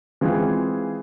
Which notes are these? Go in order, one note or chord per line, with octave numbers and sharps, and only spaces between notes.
E3 G#3 C4 F4 G#4